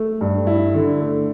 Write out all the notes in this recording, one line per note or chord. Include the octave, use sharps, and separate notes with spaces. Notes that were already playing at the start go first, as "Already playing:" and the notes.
Already playing: A3
G2
E4
D3
A3